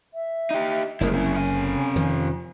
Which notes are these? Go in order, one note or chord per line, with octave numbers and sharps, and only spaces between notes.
E5
D#4 G4
F#1 C#3 G#3 A#3 E4 A#4
C3 C#4 E4
C3 G#5
F2 D#3 F3